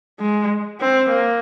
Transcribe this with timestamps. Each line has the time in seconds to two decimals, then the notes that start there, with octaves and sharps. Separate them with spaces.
0.20 G#3
0.80 C4
1.09 A#3